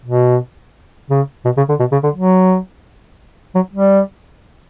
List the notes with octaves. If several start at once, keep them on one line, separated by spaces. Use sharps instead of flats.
B2
C#3
B2
C#3
D3
B2
C#3
D3
F#3
F#3
G3